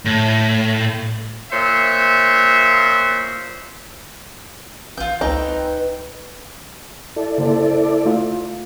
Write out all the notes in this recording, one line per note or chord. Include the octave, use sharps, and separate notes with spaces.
A2
A#2 C5 C#5 E5
A1 F4 G6
C#2 C4 D#4 B4 G5
E4 A4 D5
C#3 A#3 C5
A3 F4